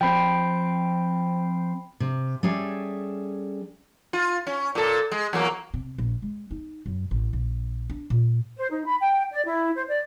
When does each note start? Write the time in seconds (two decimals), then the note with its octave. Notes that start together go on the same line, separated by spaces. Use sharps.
0.01 F3 C4 G5 B5
2.00 C3
2.43 G3 C#4 G#4 A4 E5
4.13 F4
4.47 C#4
4.75 A#2 A4
5.12 G#3
5.33 E2 F#3 A#3
5.74 C3
5.98 A#1
6.22 G#3
6.51 D#4
6.86 F#2
7.11 A1
7.33 A#1
7.90 D4
8.10 A#2
8.57 C5
8.70 D#4
8.86 B5
9.01 G5
9.31 D5
9.45 E4
9.75 C5
9.87 D5